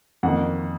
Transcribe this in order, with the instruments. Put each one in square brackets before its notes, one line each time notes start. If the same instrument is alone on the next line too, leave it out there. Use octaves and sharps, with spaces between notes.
[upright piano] F2 D#3 A#3 F#5